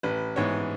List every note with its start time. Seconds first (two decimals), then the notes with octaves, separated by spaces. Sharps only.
0.03 A1 B4
0.36 G#2 E3 B3 C#5